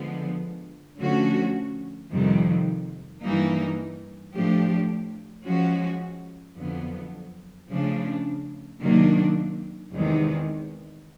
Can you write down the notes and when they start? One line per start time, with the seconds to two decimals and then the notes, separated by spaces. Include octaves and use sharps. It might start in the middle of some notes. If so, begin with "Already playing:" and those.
Already playing: D3 F3 G#3 B3
1.00 D3 F3 A3 C#4 F#4
2.11 F2 C3 D#3 G3
3.23 G2 E3 G3 A#3 D#4
4.34 A2 F3 A3 D4 G4
5.46 F3 G#3 C#4 F#4
6.58 F2 D3 F#3 B3
7.70 C#3 F3 A3 D4
8.81 C3 D#3 F#3 A#3 D4
9.93 E2 C3 D#3 G#3